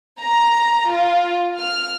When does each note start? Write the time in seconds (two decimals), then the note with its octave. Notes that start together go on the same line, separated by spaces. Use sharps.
0.21 A#5
0.90 F4
1.57 F6